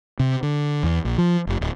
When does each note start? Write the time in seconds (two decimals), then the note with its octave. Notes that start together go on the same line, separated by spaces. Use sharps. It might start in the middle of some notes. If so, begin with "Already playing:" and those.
0.20 C3
0.43 D3
0.83 E2
1.05 A#1
1.18 F3
1.47 F1
1.61 D1